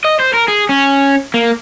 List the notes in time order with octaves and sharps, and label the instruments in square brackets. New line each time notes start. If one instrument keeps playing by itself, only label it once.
[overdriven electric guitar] D#5
C5
A#4
G#4
C#4
A#3